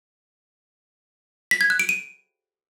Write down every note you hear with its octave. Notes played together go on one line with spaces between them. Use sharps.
B6
G#6
F#6
D7
D#7